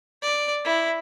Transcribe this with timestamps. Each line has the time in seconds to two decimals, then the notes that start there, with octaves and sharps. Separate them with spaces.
0.22 D5
0.64 E4